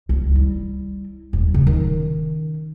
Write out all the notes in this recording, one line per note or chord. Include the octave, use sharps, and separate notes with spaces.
C#2
G3 E4
D#1
C#3
D#3 C#4